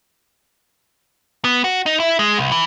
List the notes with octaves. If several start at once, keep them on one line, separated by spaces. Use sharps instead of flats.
B3
F#4
D#4
E4
G#3
C2
E3